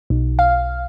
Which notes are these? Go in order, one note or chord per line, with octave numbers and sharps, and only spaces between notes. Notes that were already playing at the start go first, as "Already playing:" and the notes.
B1
F5